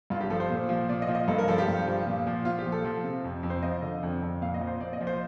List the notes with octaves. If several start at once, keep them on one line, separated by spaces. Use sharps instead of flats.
G2 F4
G4
F3 A4
C5
A#2
F3
A#2 D5
D#5
F3
D#5
G2 A4
A#4
F3 A4
G4
G2
F3
A#2
F3
A#2 F4
G4
F3
A4
F3
C3
F2
F2
C5
F3 D#5
D3
F2
F2
A#2 F5
D#5
F3
C5
A#2 D5
D#5
F3
C5